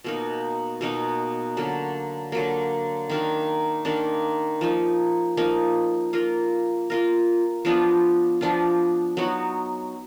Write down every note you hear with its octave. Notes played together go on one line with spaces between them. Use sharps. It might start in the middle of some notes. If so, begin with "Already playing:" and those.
B2 A#3 D#4
B2 A#3 D#4
D3 F#3 A#3
D3 F#3 A#3
D#3 A#3 D4
D#3 A#3 D4
F3 A#3 D#4
F3 A#3 D#4
A#3 F4 A#4
A#3 F4 A#4
F3 B3 D4 F4
F3 B3 D4 F4
F#3 B3 D#4 F#4